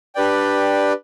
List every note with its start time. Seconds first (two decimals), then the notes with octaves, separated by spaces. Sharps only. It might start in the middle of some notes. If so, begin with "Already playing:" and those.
0.15 D4 G4 B4 D5 G5